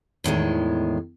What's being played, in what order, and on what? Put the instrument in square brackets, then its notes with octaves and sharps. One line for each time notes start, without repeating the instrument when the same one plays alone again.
[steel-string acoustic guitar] E2 A2 D#3 G#3